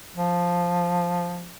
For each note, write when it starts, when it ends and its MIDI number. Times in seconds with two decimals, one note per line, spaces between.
0.16 1.51 53